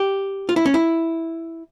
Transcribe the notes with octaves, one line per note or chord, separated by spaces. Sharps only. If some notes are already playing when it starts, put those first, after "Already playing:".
Already playing: G4
F4
E4
C#4
E4